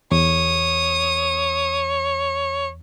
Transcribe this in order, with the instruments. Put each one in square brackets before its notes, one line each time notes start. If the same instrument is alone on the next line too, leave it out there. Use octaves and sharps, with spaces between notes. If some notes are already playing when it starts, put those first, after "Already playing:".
[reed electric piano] E2 [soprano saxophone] C#5 [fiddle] D#6